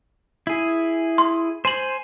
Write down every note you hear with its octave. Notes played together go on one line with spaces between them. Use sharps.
E4 G#4
C6
C5 G#5 C6 F#7